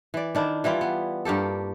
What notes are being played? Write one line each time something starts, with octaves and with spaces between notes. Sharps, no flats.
E3 D5
D#3 D4 E4
E3 G3 E4 F4
B3
G2 A#3 G4 A4